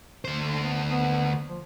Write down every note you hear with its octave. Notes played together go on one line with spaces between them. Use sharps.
D2 C5
D3
B3
B3
F3